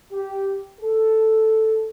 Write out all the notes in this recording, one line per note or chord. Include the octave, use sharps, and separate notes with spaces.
G4
A4